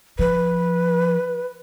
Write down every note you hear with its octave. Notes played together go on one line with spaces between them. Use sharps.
F3 B4